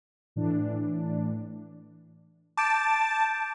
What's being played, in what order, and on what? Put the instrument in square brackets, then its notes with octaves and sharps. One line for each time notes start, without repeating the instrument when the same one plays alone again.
[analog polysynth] A2 E3 D4
[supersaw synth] A5 [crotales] D6 G6 D7